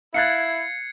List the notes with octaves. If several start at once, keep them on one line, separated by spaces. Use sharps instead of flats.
E4 F5 F#6 G#6 A6 C7 C#7